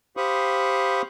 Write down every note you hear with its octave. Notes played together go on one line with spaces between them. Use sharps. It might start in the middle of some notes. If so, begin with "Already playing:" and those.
G4 C5 F5 B5 C#6 D#6